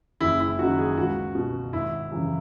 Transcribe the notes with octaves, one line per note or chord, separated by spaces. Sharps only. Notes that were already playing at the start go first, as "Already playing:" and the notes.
F#1 E4
E4
F#2 D#3 F#4
G#4
C#2 F#4
B2
G#1 E4
F#2 C#3 E3